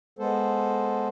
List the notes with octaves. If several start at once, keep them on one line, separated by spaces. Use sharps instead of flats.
G#3 B3 A4 C5